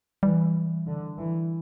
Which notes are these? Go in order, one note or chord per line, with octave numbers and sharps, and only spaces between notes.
E3 G3
D3
E3